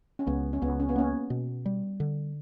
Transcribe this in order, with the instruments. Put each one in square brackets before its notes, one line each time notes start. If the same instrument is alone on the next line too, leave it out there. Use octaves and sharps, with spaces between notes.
[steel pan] C#4
[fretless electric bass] C#2 [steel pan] B3
[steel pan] C#4
[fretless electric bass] C#2 [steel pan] B3
[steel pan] C#4
B3
[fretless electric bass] A#3 [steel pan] C#4
[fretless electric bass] B2
G3
D3